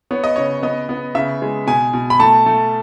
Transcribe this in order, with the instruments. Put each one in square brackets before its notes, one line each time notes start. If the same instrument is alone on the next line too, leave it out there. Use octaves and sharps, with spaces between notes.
[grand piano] B3 C#5
D#5
C#3 C#5
B3 D#5
B3
C#3 E5
G#3
B2 G#5
B2
B5
A3 A5
A3